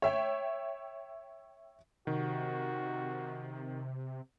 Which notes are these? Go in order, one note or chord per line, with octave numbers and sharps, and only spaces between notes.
C#5 E5 G5
C3 D#3 F#4